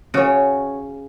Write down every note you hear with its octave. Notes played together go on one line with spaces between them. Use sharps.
C#3 C#4 F#4 C#5